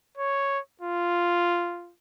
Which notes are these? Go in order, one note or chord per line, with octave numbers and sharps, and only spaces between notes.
C#5
F4